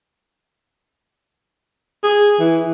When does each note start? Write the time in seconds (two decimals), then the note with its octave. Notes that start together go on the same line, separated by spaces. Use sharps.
2.04 G#4
2.40 E3